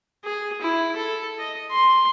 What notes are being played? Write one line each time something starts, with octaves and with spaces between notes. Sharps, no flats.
G#4
E4
A4
D#5
C6